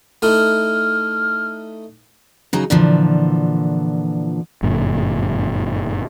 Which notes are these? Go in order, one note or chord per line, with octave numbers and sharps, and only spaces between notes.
A3 D#4 E4 F6
C#3 F#3 D#4
A#2 D3 E3 F3
G1 F#2 A#2 D3